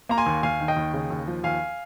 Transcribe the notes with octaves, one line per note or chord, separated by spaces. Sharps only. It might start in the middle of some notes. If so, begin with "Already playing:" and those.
A#3 A#5
G#5 C6
D#2
D#2 F5 G#5
D#3
D#5 G5
D#2
C#3
D#2
F3
D#2 F5 G#5